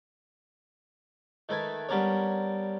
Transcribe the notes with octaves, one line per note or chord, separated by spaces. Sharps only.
D#3 A3 A4 B4 G#5
G3 B3 C#4 D4 A#4 C#5